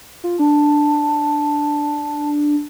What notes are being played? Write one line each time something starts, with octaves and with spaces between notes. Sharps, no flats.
F4
D4 A5